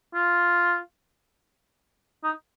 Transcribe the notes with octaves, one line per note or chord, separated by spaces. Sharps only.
F4
D#4